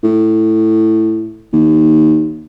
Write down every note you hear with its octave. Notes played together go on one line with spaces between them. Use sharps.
A2
D#2